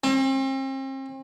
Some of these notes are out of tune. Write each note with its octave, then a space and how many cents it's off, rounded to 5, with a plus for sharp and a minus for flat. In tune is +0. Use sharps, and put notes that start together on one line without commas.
C4 +40